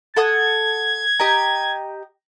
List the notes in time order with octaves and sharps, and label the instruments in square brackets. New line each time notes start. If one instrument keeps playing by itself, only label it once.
[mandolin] A4 F#5 D#6 [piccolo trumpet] G#6
[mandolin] G4 D#5 A#5